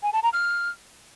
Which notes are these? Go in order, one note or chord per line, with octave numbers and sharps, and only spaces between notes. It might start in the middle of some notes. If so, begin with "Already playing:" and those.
G#5
A5
A#5
F6